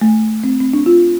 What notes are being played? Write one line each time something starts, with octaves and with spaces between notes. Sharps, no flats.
A3
C4
C4
D4
F4